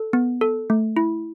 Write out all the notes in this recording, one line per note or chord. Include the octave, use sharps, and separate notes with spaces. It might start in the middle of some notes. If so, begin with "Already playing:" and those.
Already playing: A4
B3
A4
A3
E4